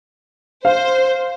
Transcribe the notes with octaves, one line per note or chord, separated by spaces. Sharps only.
C5 F5